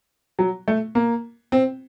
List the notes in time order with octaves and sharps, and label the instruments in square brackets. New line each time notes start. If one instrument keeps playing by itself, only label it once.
[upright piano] F#3
A3
A#3
C4